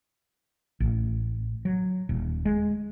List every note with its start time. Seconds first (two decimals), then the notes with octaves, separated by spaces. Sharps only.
0.80 A1
1.65 F#3
2.09 D#1
2.45 G#3